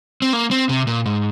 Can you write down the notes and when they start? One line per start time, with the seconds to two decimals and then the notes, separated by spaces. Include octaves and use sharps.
0.22 C4
0.33 A#3
0.51 C4
0.69 C3
0.87 A#2
1.06 G#2